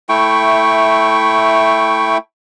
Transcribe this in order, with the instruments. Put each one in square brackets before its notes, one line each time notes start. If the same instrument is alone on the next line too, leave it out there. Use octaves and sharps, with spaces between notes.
[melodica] A3 E4 G5 C#6